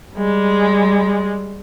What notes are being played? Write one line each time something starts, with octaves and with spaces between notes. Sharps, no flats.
G3 G#3